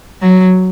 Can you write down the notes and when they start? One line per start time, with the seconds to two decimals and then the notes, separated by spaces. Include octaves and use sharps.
0.20 F#3